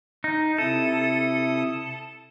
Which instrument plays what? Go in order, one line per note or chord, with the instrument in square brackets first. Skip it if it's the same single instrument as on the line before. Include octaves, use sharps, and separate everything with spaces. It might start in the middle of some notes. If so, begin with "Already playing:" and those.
[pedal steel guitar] D#4
[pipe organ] C3 E4 D#6 [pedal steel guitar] A4